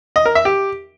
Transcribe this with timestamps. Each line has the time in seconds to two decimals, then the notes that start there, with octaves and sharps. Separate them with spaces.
0.16 D#5
0.26 A#4
0.35 E5
0.45 G4